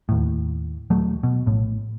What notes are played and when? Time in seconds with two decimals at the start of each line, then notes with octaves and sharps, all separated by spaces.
0.09 D#2 A2
0.90 D#1 F#3 A3
1.23 B2
1.46 A#1 A2